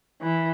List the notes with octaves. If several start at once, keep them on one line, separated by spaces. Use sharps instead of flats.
E3